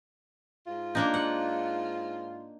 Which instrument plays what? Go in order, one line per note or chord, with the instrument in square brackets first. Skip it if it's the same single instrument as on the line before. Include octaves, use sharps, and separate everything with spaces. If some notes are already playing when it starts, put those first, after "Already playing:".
[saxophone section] G#2 F4
[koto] A#3 D4 D#4
F#5